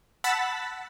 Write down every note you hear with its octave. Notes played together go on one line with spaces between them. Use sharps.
F#5 A5 B5 E6 A6 B6